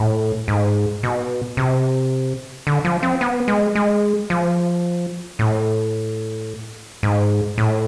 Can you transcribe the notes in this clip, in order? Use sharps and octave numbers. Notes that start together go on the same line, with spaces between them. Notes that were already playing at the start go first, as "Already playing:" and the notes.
Already playing: A2
G#2
B2
C3
D3
F3
C4
B3
G#3
G#3
F3
A2
G#2
A2